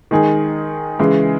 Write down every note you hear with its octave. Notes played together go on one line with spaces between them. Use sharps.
D#3 G#3 D#4 G#4
C#3 E3 G#3